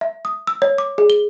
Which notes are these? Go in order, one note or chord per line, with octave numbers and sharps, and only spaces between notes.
E5
D#6
E6
C#5
D6
G#4
G7